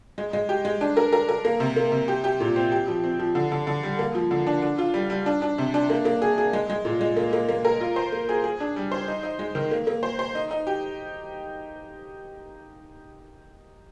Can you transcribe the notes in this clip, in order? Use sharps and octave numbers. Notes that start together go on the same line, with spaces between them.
G#3
G#3
G4
G#3
D4
A#4
A#4
A#4
A#3
C3
A#3
C3
G4
G4
A#2
C4
G4
F3
C4
F3
D3
D3
D3
G3
A#3
F3
D3
D4
D4
F4
G3
G3
D4
D4
C3
D4
A#3
A#3
G#4
G#4
G#3
G#3
A#2
G#3
A#3
A#3
A#3
A#4
F4
C5
A#3
G#4
G#4
D4
G3
C5
D#4
D#4
G#3
D#3
A#3
A#3
C5
C5
D#4
D#4
G4